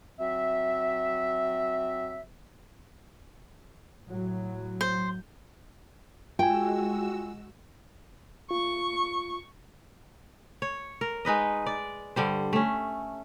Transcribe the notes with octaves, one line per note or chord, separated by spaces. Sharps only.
F#3 C4 E5
A2 F#3
C5
G#3 F4 F#4 G5 G#5 E6
F4 C#6
C#5
A#4
G#3 D#4 B4 D#5
D5
G2 D3 G3 C5
A3 C#4